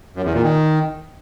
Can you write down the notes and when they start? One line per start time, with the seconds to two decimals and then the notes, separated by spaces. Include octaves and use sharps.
0.16 F#2
0.25 E2
0.34 A#2
0.43 D#3